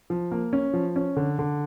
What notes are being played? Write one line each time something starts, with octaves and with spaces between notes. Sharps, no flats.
F3
A#3
C#4
F3
C#4
D3
D3